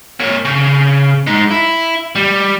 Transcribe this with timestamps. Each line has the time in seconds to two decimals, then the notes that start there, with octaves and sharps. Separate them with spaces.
0.20 A#3 C#5
0.45 C#3
1.27 G#3 D#4
1.51 E4
2.15 G3